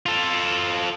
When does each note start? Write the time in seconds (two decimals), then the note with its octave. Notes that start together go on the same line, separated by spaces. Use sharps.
0.06 F4 A4